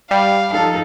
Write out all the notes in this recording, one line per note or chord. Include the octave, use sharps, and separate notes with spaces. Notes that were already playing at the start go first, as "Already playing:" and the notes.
G3 F5
F3 D#4 A4 F5